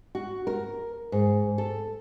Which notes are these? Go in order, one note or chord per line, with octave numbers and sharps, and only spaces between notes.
F#4
A#4
G#2
A4